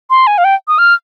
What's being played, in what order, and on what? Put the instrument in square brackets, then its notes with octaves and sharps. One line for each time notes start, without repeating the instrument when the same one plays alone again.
[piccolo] C6
G#5
F5
G5
D#6
F6